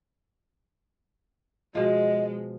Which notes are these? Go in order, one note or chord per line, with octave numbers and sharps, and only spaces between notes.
B2 F3 G#3 D#5